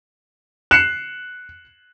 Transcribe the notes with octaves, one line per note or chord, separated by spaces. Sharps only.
F#6 C7 C#7 E7